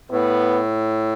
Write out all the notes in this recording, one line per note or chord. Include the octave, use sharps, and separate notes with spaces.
A2 B3